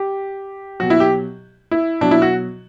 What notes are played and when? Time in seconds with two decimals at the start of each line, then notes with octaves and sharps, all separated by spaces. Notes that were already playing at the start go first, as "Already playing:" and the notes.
Already playing: G4
0.80 B2 F#3 F#4
0.90 E4
1.00 G4
1.71 E4
2.01 B2 F#3 D4
2.11 E4
2.22 F#4